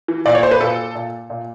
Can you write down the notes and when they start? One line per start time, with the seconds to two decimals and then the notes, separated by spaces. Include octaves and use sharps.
0.08 E3
0.26 A#2 D5
0.35 C#5
0.43 C5
0.51 B4
0.61 A#2 A4
0.95 A#2
1.30 A#2